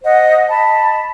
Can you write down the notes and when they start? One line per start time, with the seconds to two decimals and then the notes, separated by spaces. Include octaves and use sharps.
0.03 C5 D#5 F#5
0.49 D#5 A5 B5